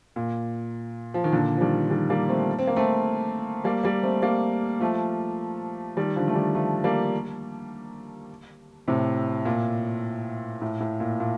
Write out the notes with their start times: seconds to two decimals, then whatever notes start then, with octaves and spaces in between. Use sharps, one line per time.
0.16 A#2
1.14 F3
1.24 D#3
1.32 A#2 D3
1.57 F3
1.61 D#3 G3
1.90 D#3 G3
2.10 G3 A#3
2.29 A3 C4
2.59 C4
2.67 A#3
2.76 A3 C4
3.64 G3 A#3
3.84 G3 A#3
4.03 A3 C4
4.22 G3 A#3
4.80 F3 A3
5.97 D#3 G3
6.16 D3 F3
6.28 A3
6.35 D#3 G3
6.55 F3 A3
6.84 G3 A#3
8.88 A2 C3
9.45 A#2
10.62 A2
10.80 A2
11.00 A#2
11.20 A#2